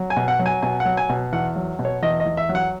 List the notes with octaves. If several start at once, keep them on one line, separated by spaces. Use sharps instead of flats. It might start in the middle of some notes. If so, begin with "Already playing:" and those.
Already playing: F#3
G#5
B2
F#5
F#3
G#5
B2 G#5
F#5
F#3
G#5
B2
E2 F#5
F#3
B2
C#5
E2 D#5
D#5
E2
E5
F#3
F#5